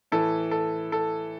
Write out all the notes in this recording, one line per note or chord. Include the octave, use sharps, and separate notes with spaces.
A2 E3 A4
A4
A4